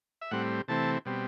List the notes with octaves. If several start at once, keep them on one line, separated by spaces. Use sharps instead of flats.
E5
A2 G3 C4 F#5
C3 E3 A3 C4 A5
B2 G3 C4